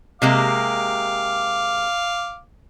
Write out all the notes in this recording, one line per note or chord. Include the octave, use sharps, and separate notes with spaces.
C3 G#3 A#3 F5 D6